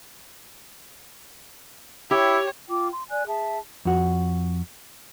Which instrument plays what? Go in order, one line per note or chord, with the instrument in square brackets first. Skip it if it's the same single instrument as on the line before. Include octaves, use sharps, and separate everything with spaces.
[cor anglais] E4 [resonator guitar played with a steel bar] G4 [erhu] C#5
[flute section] F4 G5 D6
C6
D5 G#5 F#6
G#4 E5 A5
[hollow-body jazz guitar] F2 F#4